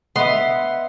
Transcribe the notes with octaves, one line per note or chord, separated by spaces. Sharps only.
B3 B4 D#5 E5 F#5 C6